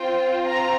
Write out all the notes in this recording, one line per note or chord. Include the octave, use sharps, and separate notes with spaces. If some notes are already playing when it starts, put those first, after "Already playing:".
Already playing: C4 F4 G5
A#5